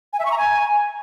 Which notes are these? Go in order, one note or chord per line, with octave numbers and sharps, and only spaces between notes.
G#5
E5
C#6
A#5
G#5